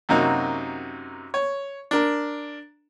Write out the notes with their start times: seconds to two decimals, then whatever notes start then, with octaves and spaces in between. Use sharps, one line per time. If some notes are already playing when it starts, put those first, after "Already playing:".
0.09 F#2 C3 A#3 D#4 F#4
1.34 C#5
1.91 D4 A#4